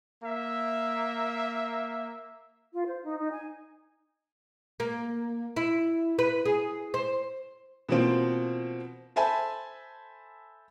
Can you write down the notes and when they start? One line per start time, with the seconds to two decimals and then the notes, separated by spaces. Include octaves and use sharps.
0.23 A#3 E5
2.73 F4
2.85 C5
3.03 D#4
3.18 D#4
3.31 G#5
4.80 A#3
5.56 E4
6.19 B4
6.45 G#4
6.94 C5
7.89 B2 E3 F3 A#3 C4
9.16 A4 C5 E5 G#5 A5 B5